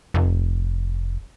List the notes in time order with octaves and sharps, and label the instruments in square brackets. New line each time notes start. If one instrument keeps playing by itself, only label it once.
[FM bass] F1